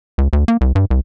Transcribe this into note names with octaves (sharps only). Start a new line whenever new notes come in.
C#2
D2
A#3
C2
G2
C2